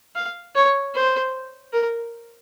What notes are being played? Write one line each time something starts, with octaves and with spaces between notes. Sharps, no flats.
F5
C#5
C5
A#4